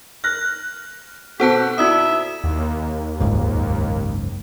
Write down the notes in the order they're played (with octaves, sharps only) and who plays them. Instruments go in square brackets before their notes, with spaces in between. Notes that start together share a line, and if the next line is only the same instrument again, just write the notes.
[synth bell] F6 [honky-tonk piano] F#6 A#6
[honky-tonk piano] B2 C4 F#4 [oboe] G4 [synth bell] A4 C5 A5
[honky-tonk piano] E4 D5 [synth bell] F#4 D#6 [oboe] E5
[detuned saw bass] D#2
[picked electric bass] F#1 C#2 G#2